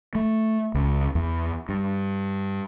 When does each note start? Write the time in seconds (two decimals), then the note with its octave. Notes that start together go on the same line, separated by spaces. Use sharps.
0.15 A3
0.74 C#2
1.15 E2
1.69 G2